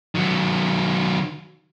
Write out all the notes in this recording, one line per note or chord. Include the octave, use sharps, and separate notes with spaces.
D#3 F#3